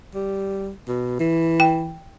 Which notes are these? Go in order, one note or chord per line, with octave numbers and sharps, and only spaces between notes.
G3
B2
E3
G5